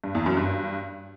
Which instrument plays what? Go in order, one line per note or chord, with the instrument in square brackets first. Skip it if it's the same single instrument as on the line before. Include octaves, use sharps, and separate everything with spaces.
[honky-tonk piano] G2
E2
F#2
G2